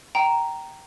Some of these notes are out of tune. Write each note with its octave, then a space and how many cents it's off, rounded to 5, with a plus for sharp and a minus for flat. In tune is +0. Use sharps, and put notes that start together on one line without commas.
G5 -15 A#5 +0